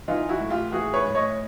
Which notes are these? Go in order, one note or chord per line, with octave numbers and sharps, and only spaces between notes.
E3 D#4 F4
E4 F#4
A2
F4 G4
E3 F#4 G#4
B4 C#5
A2
C#5 D#5